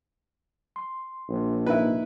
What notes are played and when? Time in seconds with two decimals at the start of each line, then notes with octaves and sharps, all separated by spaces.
0.76 C6
1.29 A#1
1.66 C3 A#3 D#4 E4 B4